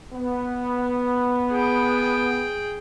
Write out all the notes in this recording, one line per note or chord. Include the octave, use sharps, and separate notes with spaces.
B3
G#4 G5